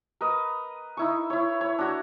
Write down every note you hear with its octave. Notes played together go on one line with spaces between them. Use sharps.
A#4 B4 D#5
D#4 E4 C#6
E4 C#5
C#5
D4 F#4